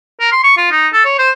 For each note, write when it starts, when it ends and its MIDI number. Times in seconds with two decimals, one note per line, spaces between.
0.20 0.30 70
0.32 0.41 84
0.44 0.56 85
0.57 0.67 65
0.71 0.88 63
0.93 1.03 69
1.05 1.14 73
1.18 1.31 72